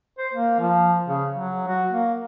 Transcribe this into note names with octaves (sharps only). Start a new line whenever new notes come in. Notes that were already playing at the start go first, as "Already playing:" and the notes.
C5
A#3
F3
C#3
F#3
F#4
A#3